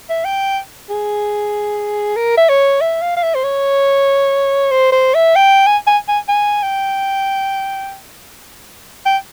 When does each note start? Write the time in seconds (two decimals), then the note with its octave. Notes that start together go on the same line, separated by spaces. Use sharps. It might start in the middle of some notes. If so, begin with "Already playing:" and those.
0.10 E5
0.25 G5
0.89 G#4
2.16 A#4
2.37 E5
2.49 C#5
2.81 E5
3.02 F5
3.16 F5
3.23 E5
3.35 C5
3.44 C#5
4.71 C5
4.92 C5
5.14 E5
5.36 G5
5.67 G#5
5.87 G#5
6.08 G#5
6.28 G#5
6.62 G5
9.06 G5